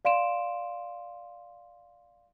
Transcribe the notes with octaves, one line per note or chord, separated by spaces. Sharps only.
D5 F5 C6 D7 E7